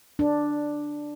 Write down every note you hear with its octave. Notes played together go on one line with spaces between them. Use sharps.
D4